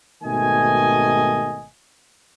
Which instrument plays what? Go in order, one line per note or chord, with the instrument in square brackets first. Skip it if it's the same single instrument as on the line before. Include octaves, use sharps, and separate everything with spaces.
[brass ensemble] G#1 B2 D#3 A3 D#5 G#5